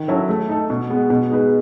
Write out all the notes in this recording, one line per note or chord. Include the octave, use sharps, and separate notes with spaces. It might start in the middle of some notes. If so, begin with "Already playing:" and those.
Already playing: D#3
F#3 C#4 E4 A4
A3
D#4 A4
B2
G#3 B3
B2
G#3 D#4 G#4 B4